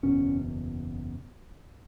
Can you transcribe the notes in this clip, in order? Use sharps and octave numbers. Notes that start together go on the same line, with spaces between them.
F#1 E2 B2 C#4